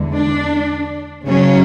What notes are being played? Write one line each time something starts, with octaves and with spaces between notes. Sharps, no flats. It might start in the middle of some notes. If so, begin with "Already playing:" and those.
Already playing: E2 D3 G#3
D4
C#3 F#3 C#4